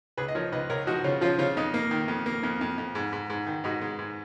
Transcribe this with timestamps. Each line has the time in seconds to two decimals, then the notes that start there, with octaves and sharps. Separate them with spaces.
0.17 C#2 G#4 B4
0.28 D#5
0.35 F3 A#4 C#5
0.52 C#2 B4 D#5
0.70 C#2 A#4 C#5
0.87 F3 D#4 F#4
1.04 C#3 C#4 F4
1.21 F3 C#4 F4
1.38 C#3 C#4 F4
1.57 F2 D#4
1.74 A#3
1.91 D#3
2.08 F2
2.26 A#3
2.43 F2
2.61 F2
2.78 F2
2.95 G#2
3.13 G#2
3.30 G#2
3.47 D#3
3.64 G#2 D#4 F#4
3.82 G#3
3.99 G#2